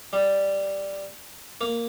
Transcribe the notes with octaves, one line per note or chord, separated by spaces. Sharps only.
G3
A#3